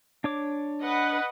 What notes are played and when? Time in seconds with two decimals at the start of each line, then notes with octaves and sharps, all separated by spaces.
0.24 D4 C#5 D6
0.82 B4 D#5 F#5